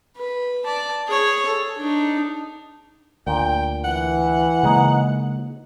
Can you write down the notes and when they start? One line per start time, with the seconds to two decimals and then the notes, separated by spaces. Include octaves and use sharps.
0.17 B4
0.65 D5 A5
1.07 G#4 C#5
1.47 A4
1.78 D4 D#4
3.27 D2 A#2 G5
3.84 E3 F#5
4.63 C#3 G#3 A#3 D#4 G#4 C#5